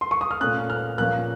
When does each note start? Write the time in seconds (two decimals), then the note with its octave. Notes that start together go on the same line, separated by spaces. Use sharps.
0.01 C6
0.11 C#6
0.21 D#6
0.31 F6
0.40 A#2 A3 C#4 F#6
0.70 F6
0.98 A#2 F3 A#3 C#4 F#6